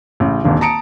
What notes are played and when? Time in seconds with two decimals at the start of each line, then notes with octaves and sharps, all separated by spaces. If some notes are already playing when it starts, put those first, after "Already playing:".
0.20 A1 C#3
0.44 D#1 G#1 D3
0.61 A5 A#5 D#6 C#7 D7